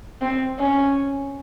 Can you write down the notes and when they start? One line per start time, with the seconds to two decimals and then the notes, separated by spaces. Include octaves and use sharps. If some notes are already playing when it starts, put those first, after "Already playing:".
0.21 C4
0.59 C#4